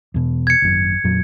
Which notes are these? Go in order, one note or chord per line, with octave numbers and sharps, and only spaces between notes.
E2 B2
G#6 C#7
G#1 F#2
F2 A#2 F#3